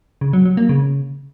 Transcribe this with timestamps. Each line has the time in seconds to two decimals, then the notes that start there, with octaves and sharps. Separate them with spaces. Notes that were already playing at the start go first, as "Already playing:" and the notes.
0.21 C#3
0.33 F#3
0.45 F#3
0.57 A#3
0.69 C#3